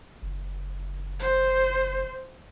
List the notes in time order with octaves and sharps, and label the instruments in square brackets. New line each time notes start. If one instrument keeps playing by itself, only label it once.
[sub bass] F#1
[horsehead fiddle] C5